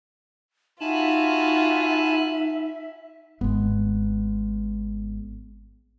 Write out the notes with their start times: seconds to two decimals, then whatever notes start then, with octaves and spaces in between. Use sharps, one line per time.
0.80 D#4 F4 F#4 E5 G#5 A5 B5
3.41 G#1 G#3 B3